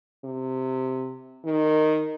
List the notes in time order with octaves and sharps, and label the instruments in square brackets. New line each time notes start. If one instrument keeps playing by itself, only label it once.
[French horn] C3
D#3